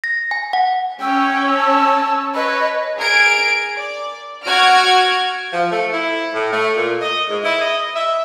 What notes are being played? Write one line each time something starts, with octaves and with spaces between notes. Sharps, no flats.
A#6
G#5
F#5
C#4 C#5 G5 E6
A5
B4 C#5 D#5
G#4 A#4 G#6 D7
D5
F#4 F#5 F6 G#6 A#6 D7
F3
A3
E4
A2
A3
A#2
D#5
G#2
E4
D#5
E5